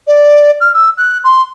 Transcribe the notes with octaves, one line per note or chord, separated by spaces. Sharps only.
D5
F6
E6
F#6
C6